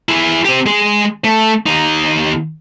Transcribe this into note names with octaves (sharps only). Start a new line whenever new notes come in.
E4 G#4
C4 G4
G#3 G#4
A3
D#2 D#4